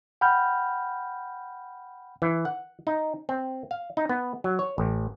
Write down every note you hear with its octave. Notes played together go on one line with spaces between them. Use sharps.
F#5 G5 B5 F6 G6
E3
F#5
D#4
C4
F5
D#4
B3
F#3
C#5
A1